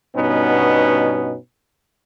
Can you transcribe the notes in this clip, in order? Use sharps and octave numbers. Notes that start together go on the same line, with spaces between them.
G2 B2 B3 C#4 D#4